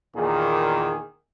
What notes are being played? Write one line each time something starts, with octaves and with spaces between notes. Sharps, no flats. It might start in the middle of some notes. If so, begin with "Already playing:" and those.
E2 A#2 D#3 A#3 G#4